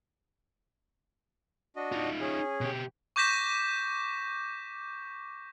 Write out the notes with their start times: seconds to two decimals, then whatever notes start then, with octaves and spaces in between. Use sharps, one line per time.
1.76 D4 F#4 D#5
1.92 D#4 F4
2.21 C#4 G#4
2.61 B2 G4
3.16 C#6 D6 G6 A#6 B6 E7